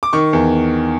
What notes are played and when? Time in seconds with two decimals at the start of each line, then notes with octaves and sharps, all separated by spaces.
0.03 D6
0.13 D#3 C#6
0.33 E2